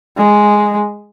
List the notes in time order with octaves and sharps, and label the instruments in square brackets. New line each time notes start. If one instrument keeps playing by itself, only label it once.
[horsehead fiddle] G#3